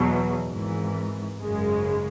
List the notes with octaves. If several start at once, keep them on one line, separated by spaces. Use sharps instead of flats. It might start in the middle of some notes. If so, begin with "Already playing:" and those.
Already playing: E2 B2 F#3
G#1 G#2 E3
G#1 F#2 C#3 G#3